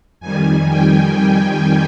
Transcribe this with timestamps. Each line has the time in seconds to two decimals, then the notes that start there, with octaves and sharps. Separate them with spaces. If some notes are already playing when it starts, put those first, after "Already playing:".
0.20 F2 D#3 G3 G#5
0.69 G5
1.15 G5